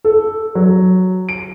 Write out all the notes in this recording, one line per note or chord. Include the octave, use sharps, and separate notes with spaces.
A4
F#3
D7